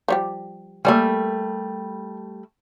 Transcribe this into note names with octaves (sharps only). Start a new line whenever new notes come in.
F3 G3 G4
G3 A3 A#3 D5 G#5